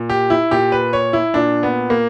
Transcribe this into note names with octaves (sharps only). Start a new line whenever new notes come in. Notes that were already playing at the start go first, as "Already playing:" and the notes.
Already playing: A#2
G4
E4
A#2 G4
B4
C#5
E4
A#2 D4
B3
A#3